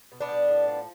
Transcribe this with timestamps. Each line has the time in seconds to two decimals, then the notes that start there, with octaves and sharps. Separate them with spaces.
0.12 B2
0.21 B3 D4
0.31 G3
0.48 A2
0.68 F3